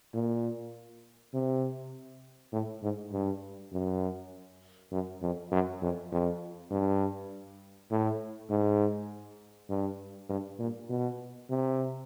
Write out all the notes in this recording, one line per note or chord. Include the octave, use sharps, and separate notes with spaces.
A#2
C3
A2
G#2
G2
F#2
F#2
F2
F#2
F2
F2
G2
A2
G#2
G2
G2
A#2
B2
C3